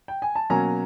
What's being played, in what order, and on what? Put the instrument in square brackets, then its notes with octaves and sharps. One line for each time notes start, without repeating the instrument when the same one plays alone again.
[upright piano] G5
G#5
A5
B2 F#3 A#3 C#4 G#5 A#5